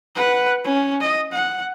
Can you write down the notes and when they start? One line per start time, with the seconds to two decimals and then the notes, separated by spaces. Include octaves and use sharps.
0.16 B4 F#5
0.65 C#4
1.00 D#5
1.32 F#5